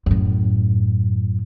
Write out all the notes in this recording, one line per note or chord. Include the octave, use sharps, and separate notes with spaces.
F#2 A2